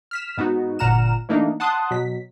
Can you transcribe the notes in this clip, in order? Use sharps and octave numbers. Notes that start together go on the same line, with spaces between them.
F6 B6 E7
G#2 B3 D#4 F#4
G1 A#2 F#5 A#5 F6 E7
E3 A3 A#3 D4 D#4
F#5 A5 C6 D#6 F#6
B2 F#3 B6